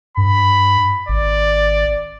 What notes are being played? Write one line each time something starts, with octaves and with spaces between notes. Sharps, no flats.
G2 B5
G#1 D5